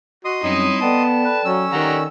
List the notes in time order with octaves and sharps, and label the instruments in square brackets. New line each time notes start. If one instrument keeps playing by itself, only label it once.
[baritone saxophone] F#4 [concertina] D#5 C6 D#6
[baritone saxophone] F#2 [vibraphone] G3 C4 C#5 [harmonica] D#4 E4
[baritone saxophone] B3 [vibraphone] A4 D5 G5 [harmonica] A5
[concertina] B4
[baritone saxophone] F#3 [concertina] C#4 E6
[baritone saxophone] D#3 [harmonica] G4 F#5 A#5